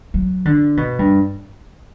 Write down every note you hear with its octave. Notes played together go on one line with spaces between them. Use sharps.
F#3
D3
B2
G2